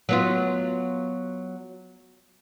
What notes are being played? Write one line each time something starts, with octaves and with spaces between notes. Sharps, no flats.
F#3 B3 F4